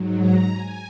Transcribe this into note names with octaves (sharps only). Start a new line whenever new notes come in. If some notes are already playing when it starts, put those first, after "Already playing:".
Already playing: G#2 F#3
A#5
G#5